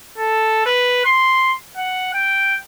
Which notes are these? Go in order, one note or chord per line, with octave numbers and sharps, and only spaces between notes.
A4
B4
C6
F#5
G5